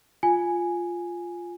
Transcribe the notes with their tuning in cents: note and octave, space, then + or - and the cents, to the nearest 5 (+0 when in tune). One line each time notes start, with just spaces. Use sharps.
F4 +0 G#5 +0